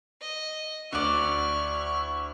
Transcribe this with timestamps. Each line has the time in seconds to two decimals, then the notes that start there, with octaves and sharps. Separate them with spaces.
0.21 D#5
0.93 D2 E4 F#4 D5 C#6 F6